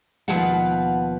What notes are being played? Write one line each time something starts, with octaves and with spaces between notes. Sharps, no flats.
D#2 B2 F3 B4 F5 F#5